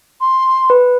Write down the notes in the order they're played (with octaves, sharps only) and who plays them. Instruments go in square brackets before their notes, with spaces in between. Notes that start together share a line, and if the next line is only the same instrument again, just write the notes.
[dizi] C6
[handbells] B4